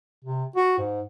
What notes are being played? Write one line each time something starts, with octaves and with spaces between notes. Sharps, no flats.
C3
F#4
G#2